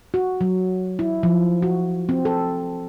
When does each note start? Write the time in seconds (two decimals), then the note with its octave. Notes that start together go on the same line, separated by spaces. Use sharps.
0.14 F#4
0.41 F#3
0.99 E4
1.23 F3
1.63 F#4
2.09 C4
2.25 A4